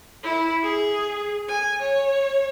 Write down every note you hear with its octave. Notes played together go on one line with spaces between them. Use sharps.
E4
G#4
G#5
C#5